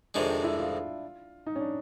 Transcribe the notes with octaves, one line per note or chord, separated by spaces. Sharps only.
F2 C3 D#3 G#3 D4
D4
E4
F4
D#4
C#4
D4